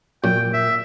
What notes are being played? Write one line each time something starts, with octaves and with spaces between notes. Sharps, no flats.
F#2 A#2 G5
E5